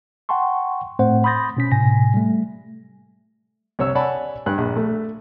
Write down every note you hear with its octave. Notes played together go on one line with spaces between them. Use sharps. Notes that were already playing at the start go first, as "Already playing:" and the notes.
F#5 G5 A5 C6 C#6
A2 A3 C4 C5 F#5
B5 C6 D#6 G6 A6 A#6
B2 C#4 B6
A2 C3 G#5 A#6
G3 A3
C2 C#5 E6
C#5 D5 F#5 G#5 A5 B5
G2 F#6
A#1
A3